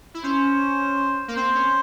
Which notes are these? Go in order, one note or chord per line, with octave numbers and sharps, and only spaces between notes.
E4
C#4 C5
A#3
C4 C5
C#4